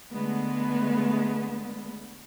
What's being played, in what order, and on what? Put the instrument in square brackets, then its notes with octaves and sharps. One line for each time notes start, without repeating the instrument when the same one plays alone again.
[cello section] D3 G#3 A3 B3